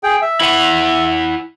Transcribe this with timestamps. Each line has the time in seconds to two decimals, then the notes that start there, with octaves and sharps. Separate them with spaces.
0.03 G#4 G5
0.22 E5
0.41 E4 B4 F#5